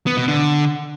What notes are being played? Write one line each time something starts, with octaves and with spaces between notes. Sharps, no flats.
B3
B2
D3